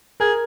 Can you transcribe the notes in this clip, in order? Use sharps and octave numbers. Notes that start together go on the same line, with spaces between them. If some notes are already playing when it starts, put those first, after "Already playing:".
G#4 A#4